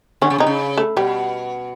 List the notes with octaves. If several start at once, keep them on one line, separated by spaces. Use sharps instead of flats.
D3 C#4
C#3
C3 D#4
C#3
A3
B2 G3